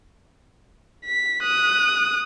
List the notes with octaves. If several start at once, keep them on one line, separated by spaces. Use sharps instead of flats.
B6
D#6 F#6